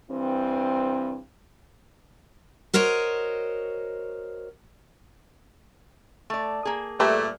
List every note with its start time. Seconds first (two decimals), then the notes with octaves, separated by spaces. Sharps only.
0.11 G2 E3 C4
2.74 F#4 A#4 C5 C#5 D#5
6.30 A3 D5
6.65 A#3 G#4
7.00 A#2 G3 A3 A4 B4